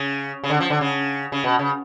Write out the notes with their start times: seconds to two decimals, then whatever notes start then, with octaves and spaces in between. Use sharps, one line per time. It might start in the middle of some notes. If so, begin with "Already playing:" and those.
Already playing: C#3
0.44 C#3
0.50 D3
0.60 F3
0.70 D3
0.81 C#3
1.32 C#3
1.44 B2
1.59 C#3